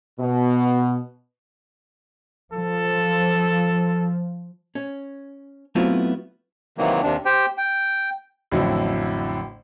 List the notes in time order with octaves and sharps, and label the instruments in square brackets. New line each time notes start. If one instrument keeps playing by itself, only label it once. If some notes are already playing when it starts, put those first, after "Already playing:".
[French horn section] B2
[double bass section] F3 [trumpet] A4
[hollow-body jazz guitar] C#4
F#3 A3 B3 C4 E4 F4
[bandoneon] C3 D#3 E3 F#3 A#3
D#2 C3 D4
G4 C5 G5
G5
[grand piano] A1 F2 D3 F#3 E4